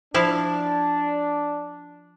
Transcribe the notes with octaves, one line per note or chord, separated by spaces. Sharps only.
F3 D4 E4 F5